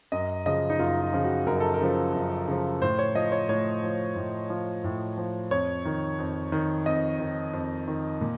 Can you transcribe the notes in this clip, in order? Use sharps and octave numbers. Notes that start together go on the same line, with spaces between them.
F#2 D#5
C#3 F3 D#5
D#4
F#2 F4
F4
C#3 F3
F#4
F#2 A#4
A4
A#4
C#3 F3
F#2
C#3 F3
A2 C5
C#5
F3 D#5
C#5
A2 C#5
F3
A2
F3
A2
F3
F2 C#5
D#3
F2
D#3
F2 D#5
D#3
F2
D#3
A#2